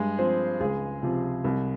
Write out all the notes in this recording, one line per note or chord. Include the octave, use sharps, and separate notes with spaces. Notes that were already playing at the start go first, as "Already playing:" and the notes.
Already playing: G2 G#3 G#4
F3 C4 C5
C#2 G#3 G#4
C3 F3
C2